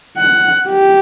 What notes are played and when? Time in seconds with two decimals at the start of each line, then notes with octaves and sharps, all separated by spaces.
0.18 F#5
0.69 G4